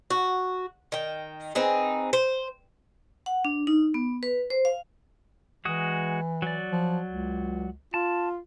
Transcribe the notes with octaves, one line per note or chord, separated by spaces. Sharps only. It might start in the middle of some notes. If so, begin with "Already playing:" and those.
F#4
D#3 G5
C4 D#4 G#4 B4
C5
F#5
D4
D#4
B3
B4
C5
F5
E3 G#3 F#4 D#6
F#3 D5
F3
C#2
F4 A5